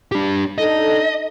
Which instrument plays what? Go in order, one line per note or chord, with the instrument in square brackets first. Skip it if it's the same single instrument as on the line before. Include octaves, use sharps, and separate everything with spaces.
[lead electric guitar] D4 G4
[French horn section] D4 D#4 A4 [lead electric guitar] D#5